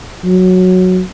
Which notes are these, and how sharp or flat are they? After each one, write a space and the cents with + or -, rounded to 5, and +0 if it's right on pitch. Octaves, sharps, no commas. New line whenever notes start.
F#3 -5